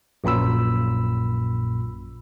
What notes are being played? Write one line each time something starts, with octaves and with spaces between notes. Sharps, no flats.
A#1 F#2 A#2 B5 E6